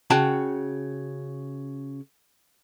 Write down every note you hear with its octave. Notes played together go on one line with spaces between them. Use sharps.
C#3 F#4 G5 A5